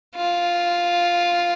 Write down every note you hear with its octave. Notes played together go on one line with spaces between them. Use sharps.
F4